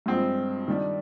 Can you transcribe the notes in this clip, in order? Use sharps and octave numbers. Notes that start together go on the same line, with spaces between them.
G2 F3 G#3 C4
D#3 G3 D4